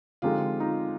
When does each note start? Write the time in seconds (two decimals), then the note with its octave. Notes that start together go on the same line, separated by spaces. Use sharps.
0.22 D3 F3 G#3 C4 D#4 F4 G4
0.60 D#4 F4